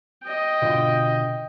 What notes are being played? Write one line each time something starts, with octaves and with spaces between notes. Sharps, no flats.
D#5 G5
B2 D3 F4